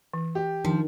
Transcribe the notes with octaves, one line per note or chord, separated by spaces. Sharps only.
E3
G4
D#3 F3 D4